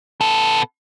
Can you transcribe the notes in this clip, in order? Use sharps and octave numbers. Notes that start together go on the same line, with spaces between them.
B3 A4